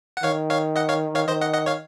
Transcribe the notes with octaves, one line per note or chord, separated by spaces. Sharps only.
F#5
D#3 C#5 F5
C#5 F5
D#5 F#5
C#5 F5
C#5 F5
D#3 C5 D#5
D#5 F#5
D#5 F#5
C#5 F5